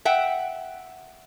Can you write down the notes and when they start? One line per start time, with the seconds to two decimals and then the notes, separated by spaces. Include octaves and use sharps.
0.05 E5 F#5 G5